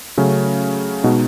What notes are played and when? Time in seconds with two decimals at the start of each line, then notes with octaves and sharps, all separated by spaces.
0.17 C#3 F#3 A3 C#4
1.04 B2 G#3 D#4 F#4